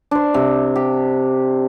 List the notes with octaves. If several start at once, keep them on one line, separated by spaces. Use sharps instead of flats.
D4 C5
C3
G4